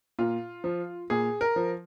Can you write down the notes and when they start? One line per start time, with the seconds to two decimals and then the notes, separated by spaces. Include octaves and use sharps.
0.19 A#2 F4
0.64 F3
1.10 A#2 G#4
1.41 A#4
1.56 F3